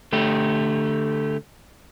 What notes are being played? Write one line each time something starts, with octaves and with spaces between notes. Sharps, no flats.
D3 A3 G4